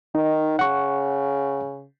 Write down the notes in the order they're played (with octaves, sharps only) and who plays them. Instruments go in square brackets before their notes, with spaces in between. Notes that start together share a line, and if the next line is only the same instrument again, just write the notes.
[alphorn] D#3 [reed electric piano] D#4
[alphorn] C#3 [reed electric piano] F#5 C#6